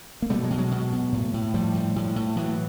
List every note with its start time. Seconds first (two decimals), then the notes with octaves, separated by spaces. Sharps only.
0.22 A#3
0.30 B2 G3 A3
0.44 F#3 G#3
0.50 B2
0.58 F#3 G#3
0.71 B2
0.92 B2
1.12 A2
1.34 A2
1.54 A2 F3 G3
1.74 A2
1.96 A2
2.16 A2
2.36 A2 E3 F#3